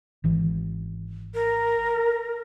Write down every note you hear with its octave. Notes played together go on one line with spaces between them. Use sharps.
G#1 E3
A#4